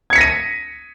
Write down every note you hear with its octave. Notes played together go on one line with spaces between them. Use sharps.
G#6 A#6 B6 C#7 D#7